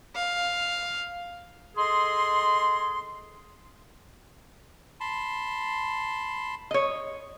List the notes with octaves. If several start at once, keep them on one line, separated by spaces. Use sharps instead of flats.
F5
G#4 A4 D#5 C6
A5 B5 C6
C#5 D#5